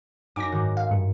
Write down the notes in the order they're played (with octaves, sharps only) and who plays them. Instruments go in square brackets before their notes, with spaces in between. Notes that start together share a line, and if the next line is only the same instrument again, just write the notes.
[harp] F#2 D#4 G#5 [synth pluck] D6 A#6
[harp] G#2 D#3 F#4
[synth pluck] F5
[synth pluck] G2 [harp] C#7